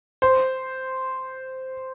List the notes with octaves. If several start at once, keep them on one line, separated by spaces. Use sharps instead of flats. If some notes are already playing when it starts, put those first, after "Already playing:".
C5